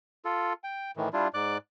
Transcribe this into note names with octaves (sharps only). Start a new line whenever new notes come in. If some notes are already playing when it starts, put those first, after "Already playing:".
F4 A4
G5
A2 D#3 E3
G3 D4 E4 F4
G#2 D5 D6 F#6